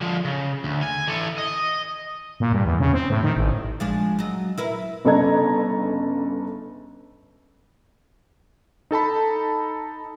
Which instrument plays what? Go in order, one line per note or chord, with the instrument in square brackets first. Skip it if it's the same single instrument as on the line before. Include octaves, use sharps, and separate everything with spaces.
[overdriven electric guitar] D3 F3
C#3
D2
G#5
E3 A4
D#5
[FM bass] A#2
G2
E2
C#3
C4
A2
D#3
A1
[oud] F3 G#3 D4
F#3 D#5
E4 A#4 B4
[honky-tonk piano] G1 C#3 A4 D#5 A#5 G#6
[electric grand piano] D#4 A4 A5 B5